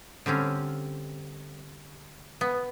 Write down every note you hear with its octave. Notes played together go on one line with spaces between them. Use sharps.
D3 G3 C4 C#4
B3